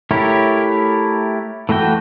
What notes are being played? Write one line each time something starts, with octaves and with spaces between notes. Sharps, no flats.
A3 E4 G4 A#4 C#5
E3 A3 F#4 G5